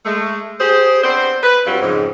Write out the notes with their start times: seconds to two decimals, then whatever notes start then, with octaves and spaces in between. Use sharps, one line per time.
0.06 G#3 A3
0.60 G4 G#4 C5
1.04 B3 C4 D4 C5
1.43 B4
1.67 G2 F#3 G3 C4 F4 F#4
1.82 F2 G#2 C#3